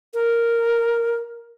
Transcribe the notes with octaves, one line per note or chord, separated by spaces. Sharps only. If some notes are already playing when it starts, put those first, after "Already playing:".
A#4